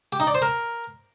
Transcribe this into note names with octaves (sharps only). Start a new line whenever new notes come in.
G4
D#4
D5
C5
A#4